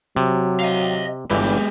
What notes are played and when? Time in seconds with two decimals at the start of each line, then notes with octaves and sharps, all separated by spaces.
0.16 C3 F#3
0.60 D#5 F5
1.31 G1 G2 E3 G#3 B3 G4